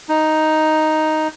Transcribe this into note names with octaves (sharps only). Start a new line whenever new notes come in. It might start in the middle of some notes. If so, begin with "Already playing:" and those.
D#4